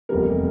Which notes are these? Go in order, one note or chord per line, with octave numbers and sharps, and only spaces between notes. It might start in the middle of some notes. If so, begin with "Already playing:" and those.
F1 E2 C3 G3 A#3 A#4